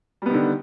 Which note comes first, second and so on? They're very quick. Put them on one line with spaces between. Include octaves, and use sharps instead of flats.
G3 B3 D#3 D3